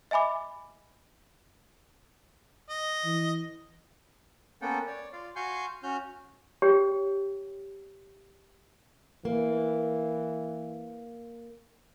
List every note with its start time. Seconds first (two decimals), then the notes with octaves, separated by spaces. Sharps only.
0.11 D#5 E5 G#5 B5 D6
2.70 D#5
3.05 E3
4.62 A#3 B3 C#4 A4 F#5 G5
4.87 C#5 D5
5.13 F4 D5 F5
5.36 F#4 F5 G#5 C6 C#6 G6
5.83 C#4 F#4 F6 G6
6.62 G4 C#5 G5
9.25 E3 A#3